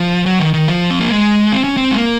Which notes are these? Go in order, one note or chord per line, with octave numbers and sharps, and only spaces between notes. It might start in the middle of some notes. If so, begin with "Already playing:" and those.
Already playing: F3
F#3
D#3
D#3
F3
C4
A#3
G#3
C4
C#4
C4
G#3
A#3